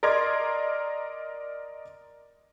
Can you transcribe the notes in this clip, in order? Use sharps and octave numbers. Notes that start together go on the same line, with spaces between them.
A#4 D5 D#5 A#5 C6 G#6